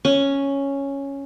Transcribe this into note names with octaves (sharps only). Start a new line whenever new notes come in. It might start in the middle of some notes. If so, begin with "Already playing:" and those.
C#4